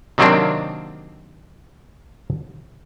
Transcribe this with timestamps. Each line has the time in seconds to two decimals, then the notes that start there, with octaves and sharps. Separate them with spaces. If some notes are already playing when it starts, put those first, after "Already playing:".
0.18 C3 D#3 F#3 A#3 C4 D4